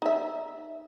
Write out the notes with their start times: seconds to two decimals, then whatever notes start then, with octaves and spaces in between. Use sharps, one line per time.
0.02 D#4 E5